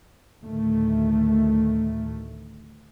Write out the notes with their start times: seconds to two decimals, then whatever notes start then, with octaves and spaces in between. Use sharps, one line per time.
0.44 D2 A2 D#3 A3